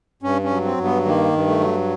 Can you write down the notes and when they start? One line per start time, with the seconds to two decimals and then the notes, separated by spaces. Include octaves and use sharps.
0.22 G2 C#4
0.44 C#4
0.50 F#3
0.65 C4
0.77 G2
0.84 B3
1.05 D#3 A#3
1.33 G2
1.47 A3
1.60 F#3